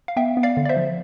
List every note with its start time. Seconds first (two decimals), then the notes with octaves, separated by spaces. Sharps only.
0.08 F5
0.16 B3 E5 G5
0.37 B3
0.43 D5 F5
0.57 D3
0.65 D5
0.69 C5 E5
0.77 F3